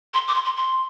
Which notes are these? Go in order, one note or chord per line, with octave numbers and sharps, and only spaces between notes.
C6
D6
C6
C6
C6